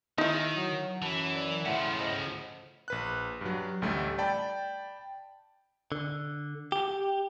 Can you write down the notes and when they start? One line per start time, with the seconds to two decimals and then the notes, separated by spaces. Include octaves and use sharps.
0.18 D#3 D#4 E4 G6
0.56 F#3
1.02 F#2 E3 A5
1.35 D5
1.65 A2 C#3 F3 E5 F#5
1.99 C5 D#5 A#6
2.88 A#1 B4 F#6
3.41 G2 F#3
3.82 A1 D2 G3 A3
4.18 D5 G5 A5 B5
5.92 D3
6.72 G4